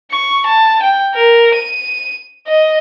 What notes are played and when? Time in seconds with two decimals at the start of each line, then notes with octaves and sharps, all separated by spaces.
0.11 C#6
0.46 A5
0.83 G5
1.14 A#4
1.55 D#7
2.47 D#5